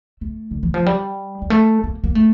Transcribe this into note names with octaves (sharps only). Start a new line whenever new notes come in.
A3
D3
E3
F3
G3
G3
A3
A#3
A#3
A3